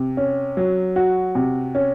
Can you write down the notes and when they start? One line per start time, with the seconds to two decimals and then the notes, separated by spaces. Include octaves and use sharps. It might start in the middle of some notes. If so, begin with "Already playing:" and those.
Already playing: C3
0.17 C#4
0.57 F#3
0.96 F#4
1.35 C3
1.75 C#4